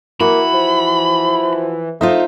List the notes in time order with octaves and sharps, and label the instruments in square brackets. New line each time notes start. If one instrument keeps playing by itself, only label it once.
[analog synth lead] E3 [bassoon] A#3 [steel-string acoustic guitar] F#4 [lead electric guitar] B5
[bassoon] F3
[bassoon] A3 [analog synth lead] D#4 [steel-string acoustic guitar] F4 C5 E5